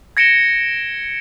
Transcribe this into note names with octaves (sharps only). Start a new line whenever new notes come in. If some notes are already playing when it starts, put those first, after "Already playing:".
G#6 A#6 C#7 D7 E7 G7